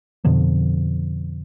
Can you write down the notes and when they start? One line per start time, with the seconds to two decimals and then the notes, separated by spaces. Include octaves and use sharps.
0.25 F2 B2 D3 F3